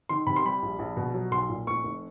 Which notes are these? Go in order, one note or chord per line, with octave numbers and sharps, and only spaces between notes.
D#3 C6
C3 B5
C6
G3 B5
A#1
A#1
B2
F#3
B1 C6
A#2
F1 C#6
F1